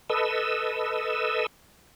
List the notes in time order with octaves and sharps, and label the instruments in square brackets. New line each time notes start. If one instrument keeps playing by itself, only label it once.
[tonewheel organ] A4 B4 D#5 E6